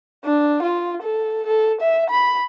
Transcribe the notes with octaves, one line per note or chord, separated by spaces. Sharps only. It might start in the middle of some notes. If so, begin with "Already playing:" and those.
D4
F4
A4
A4
E5
B5